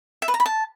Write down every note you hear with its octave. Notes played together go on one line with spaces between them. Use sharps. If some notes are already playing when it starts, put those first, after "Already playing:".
E5
B4
A#5
B5
A5